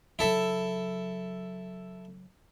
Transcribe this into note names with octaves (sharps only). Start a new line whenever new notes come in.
C#3 F#3 E4 A4 E5